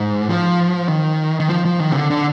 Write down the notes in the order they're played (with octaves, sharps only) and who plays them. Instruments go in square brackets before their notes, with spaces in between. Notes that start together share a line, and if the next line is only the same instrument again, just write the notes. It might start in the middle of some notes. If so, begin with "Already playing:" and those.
Already playing: [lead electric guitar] G#2
F3
D#3
D#3
F3
F3
D#3
C3
D3
D3